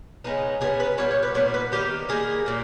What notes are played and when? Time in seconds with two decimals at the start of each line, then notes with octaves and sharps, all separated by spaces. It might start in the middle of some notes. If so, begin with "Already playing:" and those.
0.24 C#3 G#3 B3 D#4
0.61 C#3 G#3 B3 D#4 G#4
0.80 B4
0.98 A#2 G3 B3 C#5
1.11 C#5
1.23 B4
1.35 A#2 G3 B3 D#4 C#5
1.54 B4
1.72 D#3 G3 A#3 D#4 G4
2.09 D#3 G3 A#3 D#4 G#4
2.46 A#2 A#3 D#4